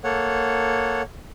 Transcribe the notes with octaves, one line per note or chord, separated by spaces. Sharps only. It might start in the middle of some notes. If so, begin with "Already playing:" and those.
A#3 A4 C#5 F#5